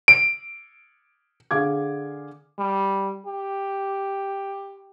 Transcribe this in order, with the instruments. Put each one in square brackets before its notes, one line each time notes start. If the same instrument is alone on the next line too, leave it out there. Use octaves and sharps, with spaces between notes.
[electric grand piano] D7
[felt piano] D3 G#4 F5 D6 G#6
[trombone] G3
G4